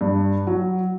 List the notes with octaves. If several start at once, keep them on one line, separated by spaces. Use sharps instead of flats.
G2
F#3